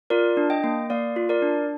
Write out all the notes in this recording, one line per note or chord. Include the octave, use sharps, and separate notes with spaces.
F4 A#4 D5
D4
D#5 G5
A#3
A#3 D5 F5
F4
A#4 D5
D4